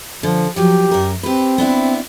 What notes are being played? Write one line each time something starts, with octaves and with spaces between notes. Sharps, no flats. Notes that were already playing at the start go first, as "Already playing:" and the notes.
D3 F3
F3 F#3 G4 A#4
F#2 A#4
C4 G4 B4
B3 D4 E4